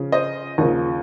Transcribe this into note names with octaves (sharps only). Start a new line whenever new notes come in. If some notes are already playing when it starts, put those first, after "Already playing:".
Already playing: C#3 F3
C5 D#5
D#2 C#3 F3